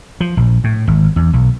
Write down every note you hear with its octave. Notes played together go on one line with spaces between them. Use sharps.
F3
A#1
A2
G#1
E2
B1